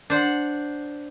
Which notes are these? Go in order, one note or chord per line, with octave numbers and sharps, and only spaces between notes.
D4 C5 F#5